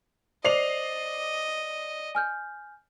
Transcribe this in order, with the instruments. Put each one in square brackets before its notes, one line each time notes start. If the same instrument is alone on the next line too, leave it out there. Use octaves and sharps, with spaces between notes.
[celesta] C5 [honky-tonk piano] D5 C7 F7 [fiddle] D#5
[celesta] G#5 F6 G6